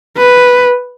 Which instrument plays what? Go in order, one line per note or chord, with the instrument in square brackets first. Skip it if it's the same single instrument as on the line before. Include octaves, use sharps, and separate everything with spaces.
[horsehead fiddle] B4